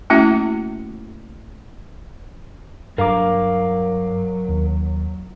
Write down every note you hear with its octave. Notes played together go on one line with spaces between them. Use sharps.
A3 A#3 C#4 E4 F#4 E5
G2 F#3 A#4 F5 A#5 D6
D#2